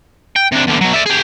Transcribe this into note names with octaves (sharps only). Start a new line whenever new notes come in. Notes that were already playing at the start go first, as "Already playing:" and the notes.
G5
C3 D4
E2 D3
B2 F#3
D5 E5
G4 G#4